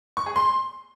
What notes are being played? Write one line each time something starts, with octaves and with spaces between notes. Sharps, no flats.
C#6
G#4
C6